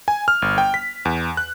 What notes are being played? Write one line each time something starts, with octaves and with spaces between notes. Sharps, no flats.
G#5
F6
G1
G5
B6
E2
F#6